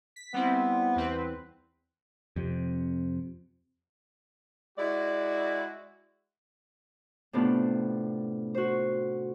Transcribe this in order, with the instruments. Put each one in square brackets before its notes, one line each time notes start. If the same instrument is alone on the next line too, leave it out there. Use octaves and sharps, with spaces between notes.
[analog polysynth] B6
[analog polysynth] G3 C4 E4 [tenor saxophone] B3
[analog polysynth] E2 C4 B4
[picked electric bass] F2 C3
[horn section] G#3 E4 F#4 [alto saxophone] D5
[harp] A2 C3 B3 D4 F4
F#4 C5